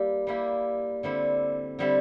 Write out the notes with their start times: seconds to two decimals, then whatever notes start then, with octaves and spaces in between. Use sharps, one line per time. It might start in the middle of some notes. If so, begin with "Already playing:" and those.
Already playing: G3 A#3 E4 G4
0.27 G3 A#3 E4 G4
1.03 D3 G3 C4 E4
1.79 D3 G3 C4 E4